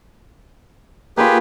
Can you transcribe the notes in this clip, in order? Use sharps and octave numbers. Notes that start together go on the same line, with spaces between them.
A#3 F4 G4 G#4 B4